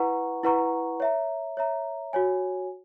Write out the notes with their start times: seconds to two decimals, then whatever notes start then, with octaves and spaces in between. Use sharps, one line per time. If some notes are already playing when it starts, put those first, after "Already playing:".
Already playing: E4 B4 F#5 A#5 C#6
0.44 E4 B4 F#5 A#5 C#6
1.00 C#5 E5 A#5
1.57 C#5 E5 A#5
2.13 F#4 C#5 G#5